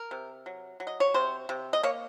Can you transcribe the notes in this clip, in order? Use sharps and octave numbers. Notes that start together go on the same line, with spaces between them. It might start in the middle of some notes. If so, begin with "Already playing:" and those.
Already playing: A#4
C3
F#3
F#3
D#5
C#5
C3 C5
C3
D#5
A#3 C#5